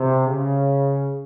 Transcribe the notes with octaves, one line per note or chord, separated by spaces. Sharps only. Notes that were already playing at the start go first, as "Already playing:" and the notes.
Already playing: C3
C#3